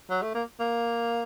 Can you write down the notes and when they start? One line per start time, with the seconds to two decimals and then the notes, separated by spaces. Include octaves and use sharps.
0.10 F#3
0.22 A3
0.34 A#3
0.60 A#3